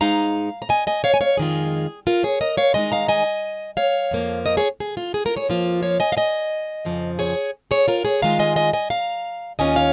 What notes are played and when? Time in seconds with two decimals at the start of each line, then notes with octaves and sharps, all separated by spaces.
0.01 G#2 G#3 D#4 F5 A#5
0.62 A#5
0.69 D#5 G#5
0.87 D#5 G#5
1.04 C#5 F5
1.14 G#5
1.21 C#5 F5
1.37 F2 D#3 G#3 F4 G#4
2.07 F4 A#4
2.23 G#4 C#5
2.41 A#4 D#5
2.57 C#5 F5
2.74 D#3 G#3 D#4 D#5 G#5
2.92 F5 A#5
3.08 D#5 G#5
3.77 C#5 F5
4.11 F2 F3 A#3
4.46 A#4 D#5
4.57 G#4 C#5
4.80 G#4
4.97 F4
5.14 G#4
5.25 F4 A#4
5.37 G#4 C#5
5.49 F2 F3 A#3 F4
5.83 C#5 F5
6.00 D#5 G#5
6.12 F5
6.17 D#5 G#5
6.85 F2 C#3 F3
7.19 G#4 C#5
7.71 G#4 C#5
7.88 F4 A#4
8.05 G#4 C#5
8.22 D#3 G#3 F4 F5 A#5
8.39 D#5 G#5
8.56 D#5 G#5
8.73 D#5 G#5
8.90 F5 A#5
9.59 D#2 D#3 C#4 F4 D#5 G#5
9.76 C#5 F5